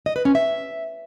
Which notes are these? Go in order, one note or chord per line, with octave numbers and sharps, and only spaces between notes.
D#5
B4
C#4
E5